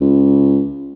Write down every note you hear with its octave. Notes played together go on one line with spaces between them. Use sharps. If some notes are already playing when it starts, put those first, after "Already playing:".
C#2